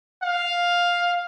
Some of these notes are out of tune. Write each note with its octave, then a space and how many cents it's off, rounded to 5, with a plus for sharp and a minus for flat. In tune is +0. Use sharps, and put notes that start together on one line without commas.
F5 +5